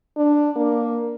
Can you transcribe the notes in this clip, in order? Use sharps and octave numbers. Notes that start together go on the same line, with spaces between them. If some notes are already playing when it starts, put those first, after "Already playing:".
D4
A#3